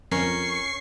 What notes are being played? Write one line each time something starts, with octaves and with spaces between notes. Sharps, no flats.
F2 C#4 A#4 C#6 C7